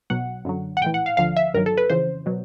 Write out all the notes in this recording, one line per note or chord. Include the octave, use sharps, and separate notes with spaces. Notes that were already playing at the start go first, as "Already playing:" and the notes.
B1 B2 F#3 F#5
F#2 D3 F#3
F#5
A#1 A2 E3 G5
F#5
F5
D2 D3 F3 F5
E5
G1 G2 D#3 F#3 A#4
A4
B4
F2 C#3 E3 C5
B2 F#3